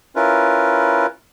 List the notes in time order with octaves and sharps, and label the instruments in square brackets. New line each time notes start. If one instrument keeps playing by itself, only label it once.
[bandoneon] C#4 E4 F4 A#4 B4